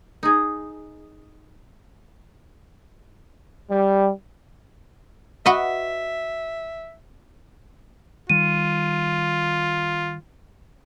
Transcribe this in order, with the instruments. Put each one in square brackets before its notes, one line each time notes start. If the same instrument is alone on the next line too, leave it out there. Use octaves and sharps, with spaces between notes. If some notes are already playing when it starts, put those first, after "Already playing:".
[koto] D#4 G#4
[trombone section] G3
[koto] F#4 B4 D#5 [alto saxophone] E5
[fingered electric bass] D#3 G3 [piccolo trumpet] F4 [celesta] D#7